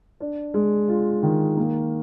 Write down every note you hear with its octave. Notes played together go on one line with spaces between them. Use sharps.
D4
G#3
F4
D#3
A#3